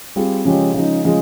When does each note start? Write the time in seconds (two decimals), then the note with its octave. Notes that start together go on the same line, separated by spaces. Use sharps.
0.16 G3 C4 F4 G#4
0.45 C#3 F3 G#3 C#4 G4
0.74 C#3 F3 G#3 D#4
1.05 C#3 F3 G#3